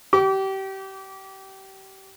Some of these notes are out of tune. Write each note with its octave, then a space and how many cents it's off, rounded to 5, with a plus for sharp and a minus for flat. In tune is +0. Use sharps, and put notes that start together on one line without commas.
G4 -25 D6 -35